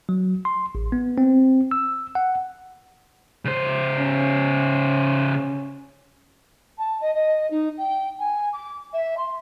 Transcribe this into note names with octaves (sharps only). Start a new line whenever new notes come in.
F#3
C6
A1
B3
C4
E6
F#5
C#3 C5
C#4
A5
D#5
D#5
D#4
G5
G#5
D6
E5
C6